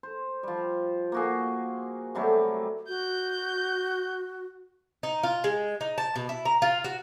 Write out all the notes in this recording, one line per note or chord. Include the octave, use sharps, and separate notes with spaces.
C5
F3 G3
A#3 F#4 G#4
C3 F#3 G3 A3
F#4 G6
D#4
F4
G#3
D#4
A5
B2
E4
A#5
F4
F#4